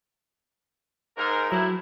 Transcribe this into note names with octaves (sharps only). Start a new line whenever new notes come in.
G#2 A#4
A2 F#3 E4 A#5